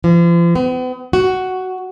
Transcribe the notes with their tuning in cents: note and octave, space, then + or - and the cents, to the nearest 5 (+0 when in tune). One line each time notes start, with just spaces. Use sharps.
F3 -40
B3 +45
F#4 +10